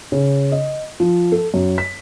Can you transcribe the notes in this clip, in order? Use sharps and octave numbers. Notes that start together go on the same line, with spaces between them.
C#3
D#5
F3
A4
F#2
B6